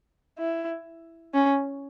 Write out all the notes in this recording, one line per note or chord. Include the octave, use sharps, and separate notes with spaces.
E4
C#4